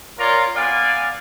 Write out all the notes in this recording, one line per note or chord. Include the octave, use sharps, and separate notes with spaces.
F4 A#4 C#5 D5 A#5
B3 D5 F5 G#5